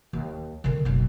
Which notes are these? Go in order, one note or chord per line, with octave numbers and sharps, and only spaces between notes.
D#2
D3 D#3
F#1 B1